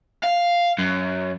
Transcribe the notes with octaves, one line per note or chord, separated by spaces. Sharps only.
F5
F#2